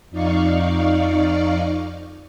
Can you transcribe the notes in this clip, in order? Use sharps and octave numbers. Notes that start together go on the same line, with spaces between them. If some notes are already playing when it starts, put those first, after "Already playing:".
F2 D#4 D5 F5 C#6